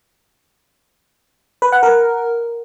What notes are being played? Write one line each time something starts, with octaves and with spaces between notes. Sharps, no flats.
B4
F#5
A#4